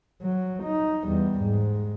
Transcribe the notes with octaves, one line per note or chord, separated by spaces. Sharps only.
F#3
D#4
E2 G3
G#2